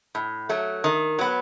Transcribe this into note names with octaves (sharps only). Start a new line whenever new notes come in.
A2
F#3 A3
D#3
F#3 B3